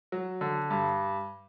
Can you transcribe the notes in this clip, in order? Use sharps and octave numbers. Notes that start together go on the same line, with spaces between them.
F#3
D3
G2